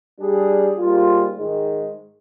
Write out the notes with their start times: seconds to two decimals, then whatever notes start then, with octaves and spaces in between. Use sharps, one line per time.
0.18 G3 D4 G#4
0.78 G#2 G3 A#3 F4
1.37 G#2 D#3 G#3